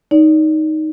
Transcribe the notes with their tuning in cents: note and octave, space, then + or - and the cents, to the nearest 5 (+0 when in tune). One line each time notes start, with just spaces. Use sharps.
D#4 +0 D5 -35